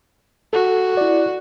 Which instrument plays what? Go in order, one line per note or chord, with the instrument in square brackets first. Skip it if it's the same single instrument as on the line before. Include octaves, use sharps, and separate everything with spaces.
[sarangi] F#4 [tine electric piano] A4
[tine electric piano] E4 D5